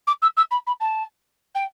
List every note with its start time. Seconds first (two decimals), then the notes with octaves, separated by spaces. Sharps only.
0.07 D6
0.22 E6
0.37 E6
0.51 B5
0.66 B5
0.80 A5
1.54 G5